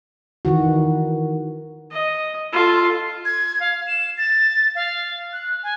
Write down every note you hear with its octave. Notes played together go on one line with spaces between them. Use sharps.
D#3 E3 F#4
D#5
F4 A4
G#6
F5
E7
A6
F5
F#6
G#5